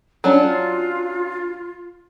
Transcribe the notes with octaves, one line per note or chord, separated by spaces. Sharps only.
F#3 C#4 D4 F4